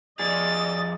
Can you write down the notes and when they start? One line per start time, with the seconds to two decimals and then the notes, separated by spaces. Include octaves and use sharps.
0.19 F2 G#4 D5 D#5 A6